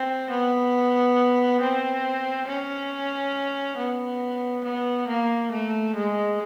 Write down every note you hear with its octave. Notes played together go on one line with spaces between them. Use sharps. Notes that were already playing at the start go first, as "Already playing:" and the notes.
Already playing: C4
B3
C4
C#4
B3
B3
A#3
A3
G#3